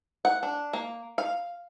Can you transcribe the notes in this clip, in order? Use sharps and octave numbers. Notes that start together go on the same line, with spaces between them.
F#5
D4
A#3
F5